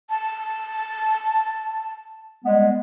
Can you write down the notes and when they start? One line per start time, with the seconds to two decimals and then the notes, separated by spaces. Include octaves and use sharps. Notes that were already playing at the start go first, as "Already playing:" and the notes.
0.10 A5
2.45 G3 G#3 B3